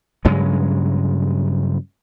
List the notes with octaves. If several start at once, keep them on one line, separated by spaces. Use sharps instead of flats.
G2 C#3 F#3 G#3